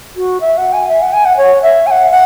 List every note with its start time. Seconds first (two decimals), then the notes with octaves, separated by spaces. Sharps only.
0.16 F#4
0.41 E5
0.58 F#5
0.73 G#5
0.89 E5
1.02 F#5
1.13 G#5
1.25 F#5
1.37 C#5
1.62 E5
1.87 G#5
1.91 F#5
2.11 F#5